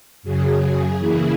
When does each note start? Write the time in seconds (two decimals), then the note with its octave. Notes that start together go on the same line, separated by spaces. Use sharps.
0.23 F#2 C#3 F#3 G#4
0.99 C#3 E3 A#3 E4